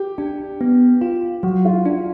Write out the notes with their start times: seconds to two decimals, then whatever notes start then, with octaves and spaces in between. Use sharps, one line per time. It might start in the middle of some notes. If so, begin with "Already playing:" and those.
Already playing: G4
0.18 D4
0.61 B3
1.01 F4
1.43 F#3 F#4
1.65 F4
1.86 D4